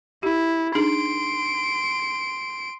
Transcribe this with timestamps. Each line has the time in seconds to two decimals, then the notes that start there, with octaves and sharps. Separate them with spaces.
0.23 E4 G4
0.75 D4 D#4 G#4 C6 D7